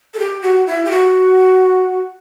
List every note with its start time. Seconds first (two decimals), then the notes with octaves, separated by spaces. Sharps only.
0.14 A4
0.19 G4
0.42 F#4
0.67 E4
0.85 G4
0.91 F#4